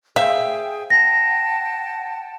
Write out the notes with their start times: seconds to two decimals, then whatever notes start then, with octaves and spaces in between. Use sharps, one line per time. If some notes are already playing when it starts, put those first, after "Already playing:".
0.16 G#4 C5 E5 F5 G5
0.90 F#5 G5 A5 A#6